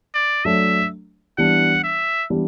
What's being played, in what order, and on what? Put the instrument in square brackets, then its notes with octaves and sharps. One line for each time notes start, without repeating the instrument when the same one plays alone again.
[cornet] D5
[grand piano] F#3 A3 D4 [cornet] E5
[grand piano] E3 G3 B3 D4 [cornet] F#5
[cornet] E5
[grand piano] E3 G3 B3 D4